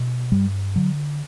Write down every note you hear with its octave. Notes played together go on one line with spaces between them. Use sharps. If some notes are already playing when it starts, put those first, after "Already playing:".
Already playing: B2
G2 G3
D3 F#3